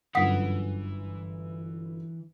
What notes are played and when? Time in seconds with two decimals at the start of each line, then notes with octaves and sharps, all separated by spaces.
0.15 G1 F#2 E3 F#5 D#6 B6